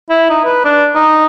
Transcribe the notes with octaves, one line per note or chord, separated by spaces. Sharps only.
E4
D#4
B4
D4
D#4